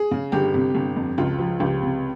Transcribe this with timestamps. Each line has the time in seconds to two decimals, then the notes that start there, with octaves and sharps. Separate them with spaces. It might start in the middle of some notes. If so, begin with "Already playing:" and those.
Already playing: G#4
0.11 C#3
0.32 G1 G4
0.54 C3
0.75 G1
0.96 F2
1.18 C#2 F4
1.39 F3
1.60 C#2 G4
1.82 C3